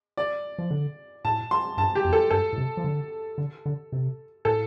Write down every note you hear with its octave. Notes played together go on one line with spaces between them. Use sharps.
D5
F3
D3
A2 A5
C6
G2 A5
G4
F2
A4
G2 A4
A2
C3
F3
D3
D3
D3
C3
A2 A4